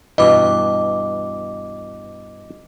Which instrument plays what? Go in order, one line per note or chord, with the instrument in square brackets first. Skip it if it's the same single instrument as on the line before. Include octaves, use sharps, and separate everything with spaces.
[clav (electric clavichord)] G2 B2 E3 [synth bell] D#5 D6